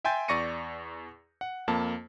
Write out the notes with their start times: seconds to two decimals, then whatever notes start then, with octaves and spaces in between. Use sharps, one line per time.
0.05 E5 G5 G#5 C6 G6 A6
0.28 E2 D5 C#6 A#6 C#7 D#7
1.41 F#5
1.68 F2 A#3 A5